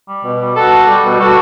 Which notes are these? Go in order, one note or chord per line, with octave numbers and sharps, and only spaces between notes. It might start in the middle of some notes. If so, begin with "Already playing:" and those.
G3
B2
G3
B2 F#4 A4
G3
G3
B2
B2 F#4 A4